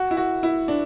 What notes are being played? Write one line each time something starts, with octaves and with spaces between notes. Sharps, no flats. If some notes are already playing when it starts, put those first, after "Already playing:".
Already playing: F#4
E4
F#4
E4
D4